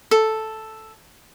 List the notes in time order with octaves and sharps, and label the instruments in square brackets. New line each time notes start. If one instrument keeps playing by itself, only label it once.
[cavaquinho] A4